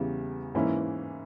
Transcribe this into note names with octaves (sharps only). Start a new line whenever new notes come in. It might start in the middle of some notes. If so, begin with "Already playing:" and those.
Already playing: E2 C#3 E3 G3
G#2 E3 A#3 C#4 E4